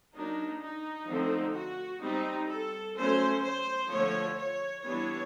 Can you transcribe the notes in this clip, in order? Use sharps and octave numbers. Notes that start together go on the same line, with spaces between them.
F#3 A#3 D4 D#4
D#4
D3 F3 A3 C4
F#4
G3 C4 D#4
A4
F#3 A3 C#4 C5
C5
D3 F3 A3 C#5
C#5
E3 G3 B3 D4 C#5